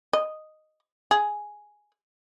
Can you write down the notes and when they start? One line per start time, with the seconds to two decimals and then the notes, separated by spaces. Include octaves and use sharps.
0.13 D#5
1.11 G#4